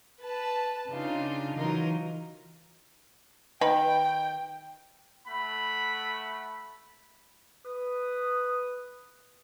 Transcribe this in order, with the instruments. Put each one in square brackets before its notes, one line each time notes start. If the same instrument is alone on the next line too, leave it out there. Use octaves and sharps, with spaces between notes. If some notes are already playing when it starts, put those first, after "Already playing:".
[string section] B4 A5
C#3 D4 D#4 F4
E3 F#3 D#4 F4 A#4
[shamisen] D#3 B4 B5 [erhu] G5
[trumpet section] A3 F#5 B5
[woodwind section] B4 D#6